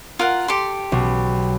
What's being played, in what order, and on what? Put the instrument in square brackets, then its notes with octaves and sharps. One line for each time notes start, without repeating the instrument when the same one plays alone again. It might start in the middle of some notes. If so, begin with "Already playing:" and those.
[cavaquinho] F4 A#4 F#5
G4 A4 C6
[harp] B1